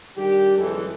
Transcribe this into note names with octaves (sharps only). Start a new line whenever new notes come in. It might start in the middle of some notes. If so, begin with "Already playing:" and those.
D#3 G3 D4 G4
G1 F#2 E3 G#3 A4